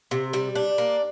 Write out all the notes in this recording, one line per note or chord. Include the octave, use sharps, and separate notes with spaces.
C3
G3
D4
A#3